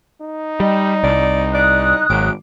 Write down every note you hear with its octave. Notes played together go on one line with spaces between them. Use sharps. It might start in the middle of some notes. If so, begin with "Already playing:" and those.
D#4
G3 D#5
C2 D5
D5 D#6 F#6
G#1 F#3 D6